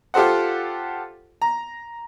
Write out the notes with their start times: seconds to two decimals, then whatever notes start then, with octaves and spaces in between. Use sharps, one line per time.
0.14 F4 G4 A4 C5 F#5
1.42 A#5